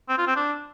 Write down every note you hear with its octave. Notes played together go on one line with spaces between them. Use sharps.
C4
F4
C4
D4